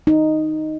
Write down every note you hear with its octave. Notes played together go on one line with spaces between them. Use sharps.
D#4